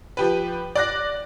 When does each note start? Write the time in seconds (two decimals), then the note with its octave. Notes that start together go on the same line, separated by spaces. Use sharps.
0.17 F3 G4 B4
0.75 D5 F#6 A#6